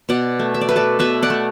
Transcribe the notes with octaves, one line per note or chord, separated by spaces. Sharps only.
B2 D5 F#5
A3
E5
D5
A3 B4
A4 D5
B2 B4 E5
D5 F#5
A3